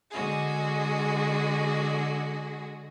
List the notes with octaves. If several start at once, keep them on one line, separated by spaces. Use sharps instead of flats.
D3 G#3 F#4 G#4